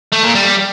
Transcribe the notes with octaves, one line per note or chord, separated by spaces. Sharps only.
A3
A#2
G3